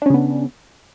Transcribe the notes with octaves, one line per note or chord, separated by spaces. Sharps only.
C#3 B3 C#4 D4